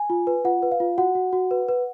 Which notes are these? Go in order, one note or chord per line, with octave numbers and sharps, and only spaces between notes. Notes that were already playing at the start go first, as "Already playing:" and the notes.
Already playing: G#5
F4
B4
F4 F#5
B4
F5
F4
F#4 F#5
F#4
F#4
B4
B4